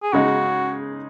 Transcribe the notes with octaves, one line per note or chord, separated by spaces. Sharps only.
G#4
C#3 G#3 D#4 F#4